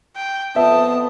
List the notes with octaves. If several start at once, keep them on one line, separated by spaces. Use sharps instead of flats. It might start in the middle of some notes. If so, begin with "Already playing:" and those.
G5
F2 B3 E5 A5 D#6